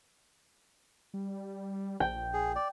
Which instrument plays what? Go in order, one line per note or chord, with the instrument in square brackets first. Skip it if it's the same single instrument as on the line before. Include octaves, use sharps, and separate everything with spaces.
[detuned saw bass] G3
[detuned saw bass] A#1 [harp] G5
[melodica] G#4
D5